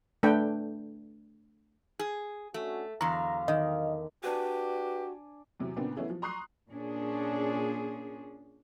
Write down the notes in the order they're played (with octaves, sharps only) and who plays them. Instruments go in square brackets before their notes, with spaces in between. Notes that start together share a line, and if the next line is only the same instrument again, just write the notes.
[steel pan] A3 D4 B4 G5
[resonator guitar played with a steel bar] G#4
[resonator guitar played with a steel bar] A3 [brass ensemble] C#4 D4 F#4
[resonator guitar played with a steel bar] E2 D3 [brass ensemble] F#3 F5 [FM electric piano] A#5
[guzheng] D#3 [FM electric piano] D#5
[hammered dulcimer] D4 D5 G#5 [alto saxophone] F#4 [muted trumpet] G4 [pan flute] B4
[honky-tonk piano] E2 C3 F#3
A#2 C#3 B3 C4 D4
E3 A3 B3 C#4 E4 G#4
F3
A#5 C6 C#6 D#6 F#6 C7
[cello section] A#2 C#4 D4 G#4